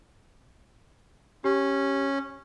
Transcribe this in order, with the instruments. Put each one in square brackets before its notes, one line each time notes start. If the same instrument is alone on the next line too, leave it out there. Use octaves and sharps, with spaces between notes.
[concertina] C#4 [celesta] G4